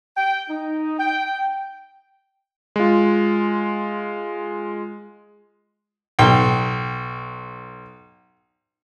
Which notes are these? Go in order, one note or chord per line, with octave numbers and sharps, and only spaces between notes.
G5
D#4
G5
G#3 F4
B1 G5